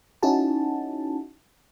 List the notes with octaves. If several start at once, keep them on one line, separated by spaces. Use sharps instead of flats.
C#4 D#4 E4 F#4 G#4 A5